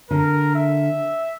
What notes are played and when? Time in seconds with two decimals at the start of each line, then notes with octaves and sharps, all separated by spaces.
0.11 D3 A#4
0.56 E5